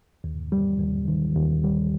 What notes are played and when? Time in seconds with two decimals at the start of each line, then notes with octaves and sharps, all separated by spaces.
0.24 D#2
0.52 G3
0.80 D#2
1.08 D#3
1.36 D#2
1.64 G3